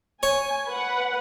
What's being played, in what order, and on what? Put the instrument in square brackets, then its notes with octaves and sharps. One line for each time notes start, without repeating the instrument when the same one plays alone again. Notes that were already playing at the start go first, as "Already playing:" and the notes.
[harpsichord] C#5 [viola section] G#5
[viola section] B4 F#5